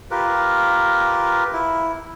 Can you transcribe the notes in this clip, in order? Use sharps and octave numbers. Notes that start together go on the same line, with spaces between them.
F4 G4 A#4 B4
E4